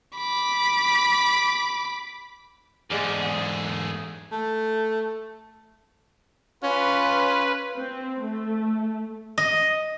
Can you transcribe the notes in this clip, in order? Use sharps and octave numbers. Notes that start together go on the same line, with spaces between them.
B5 D6
E2 G#2 G#3 A3 G#4 D5 F5
A3
C#4 F4 B4
C4
A3
D#5